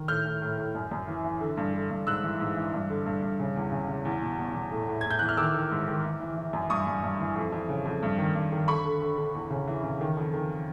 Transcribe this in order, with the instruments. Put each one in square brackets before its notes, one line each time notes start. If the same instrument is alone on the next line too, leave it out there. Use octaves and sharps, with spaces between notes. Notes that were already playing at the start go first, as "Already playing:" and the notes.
Already playing: [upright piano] D#3
A2 F6 G6
A2
A2
A2
F#2
F#2
E3
E3
D3
G2
D3
G2
G#2 E6 F#6
E3
G#2
E3
G2
D3
G2
G2
C#3
E2
C#3
C#3
E2
B2
B2
E2
A2
A2
A2 G#6
G6
E3 F#6
F6
D#3 D6 E6
D#3
G#2
D#3
E3
E3
E3
F#2
G2 C#6 D#6
G2
G2
E3
F2
F2
C#3
F2
G2
D#3
G2
D#3
D3 B5 C#6
D3
D3
D3
E2
C#3
E3
C#3
D#3
F2
D#3